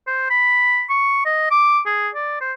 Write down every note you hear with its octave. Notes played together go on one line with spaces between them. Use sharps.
C5
B5
C#6
D#5
D6
G#4
D5
C5